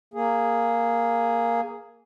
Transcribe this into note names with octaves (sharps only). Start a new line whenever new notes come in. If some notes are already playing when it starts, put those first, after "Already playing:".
A#3 G#4